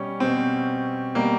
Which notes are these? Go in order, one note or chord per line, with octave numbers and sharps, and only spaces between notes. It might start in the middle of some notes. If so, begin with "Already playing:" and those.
Already playing: B2 G3 C#4
B2 G3 C4
B2 G3 A#3